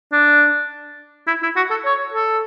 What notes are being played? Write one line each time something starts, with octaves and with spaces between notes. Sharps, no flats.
D4
E4
E4
F#4
A4
C#5
A4